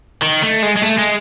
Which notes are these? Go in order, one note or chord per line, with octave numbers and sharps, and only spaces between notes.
D#3
A3
G#3
G#3
A3
G#3